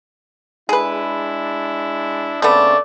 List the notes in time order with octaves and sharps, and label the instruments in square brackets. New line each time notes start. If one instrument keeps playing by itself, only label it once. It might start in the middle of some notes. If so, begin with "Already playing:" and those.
[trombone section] G#3 D4 E4 [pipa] G#4 B4
[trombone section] C#3 C4 D4 [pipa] A3 B3 [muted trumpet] D5